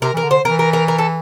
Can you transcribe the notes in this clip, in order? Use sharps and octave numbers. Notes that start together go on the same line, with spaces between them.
C3 A#4
E3 A#4
D3
C5
E3 A#4
A#4
A#4
A#4
A4